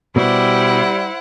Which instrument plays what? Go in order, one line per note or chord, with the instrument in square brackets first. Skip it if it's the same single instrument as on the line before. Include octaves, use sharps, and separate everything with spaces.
[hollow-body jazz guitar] B2 [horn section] G3 [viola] E4 [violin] C5 F#5